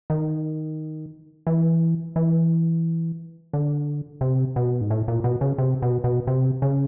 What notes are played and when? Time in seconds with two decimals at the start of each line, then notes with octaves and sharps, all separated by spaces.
0.10 D#3
1.47 E3
2.16 E3
3.53 D3
4.21 C3
4.56 B2
4.81 G#2
4.90 A2
5.08 A#2
5.24 B2
5.41 C#3
5.58 C3
5.82 B2
6.04 B2
6.27 C3
6.62 C#3